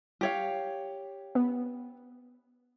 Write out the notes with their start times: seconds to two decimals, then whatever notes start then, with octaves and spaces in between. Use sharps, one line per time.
0.21 G4 C#5 F5
1.35 B3